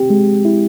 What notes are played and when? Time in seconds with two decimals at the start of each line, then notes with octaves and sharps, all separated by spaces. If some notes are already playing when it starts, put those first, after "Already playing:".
Already playing: C4 G4
0.10 G#3
0.45 E4